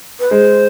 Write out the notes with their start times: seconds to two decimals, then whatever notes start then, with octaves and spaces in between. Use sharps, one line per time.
0.20 B4
0.31 G#3 C5